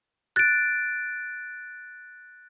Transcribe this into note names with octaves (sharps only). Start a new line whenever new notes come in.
F#6 A6 D7